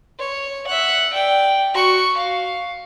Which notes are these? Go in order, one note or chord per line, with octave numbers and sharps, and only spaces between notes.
C#5
E5 F#5
D5 G5
F#4 C#6
F5